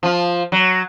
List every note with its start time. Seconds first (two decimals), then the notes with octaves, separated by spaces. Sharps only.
0.03 F3 F4
0.52 F#3